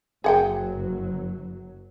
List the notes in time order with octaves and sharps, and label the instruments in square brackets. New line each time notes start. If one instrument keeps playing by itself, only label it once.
[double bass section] F#1 F#3 [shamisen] G#4 F#5 G5